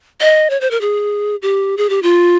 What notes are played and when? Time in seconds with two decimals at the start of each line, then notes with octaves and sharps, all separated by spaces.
0.21 D#5
0.50 C#5
0.61 C5
0.71 A#4
0.81 G#4
1.42 G4
1.77 G#4
1.89 G4
2.03 F4